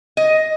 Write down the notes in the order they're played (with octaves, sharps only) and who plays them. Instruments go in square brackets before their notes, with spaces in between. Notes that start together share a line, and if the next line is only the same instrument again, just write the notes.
[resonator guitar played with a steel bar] D#5